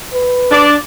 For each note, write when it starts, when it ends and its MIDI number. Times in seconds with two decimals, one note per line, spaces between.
0.13 0.66 71
0.51 0.74 62
0.51 0.74 74